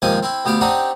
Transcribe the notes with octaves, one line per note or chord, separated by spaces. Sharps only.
D#2 G#2 C3 F3 C4 G#5
C4 E4
D2 B3 G4 F5 D6
C4 D4 D#4 G4 F#5